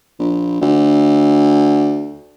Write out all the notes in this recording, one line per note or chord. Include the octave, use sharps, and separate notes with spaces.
A#1
D2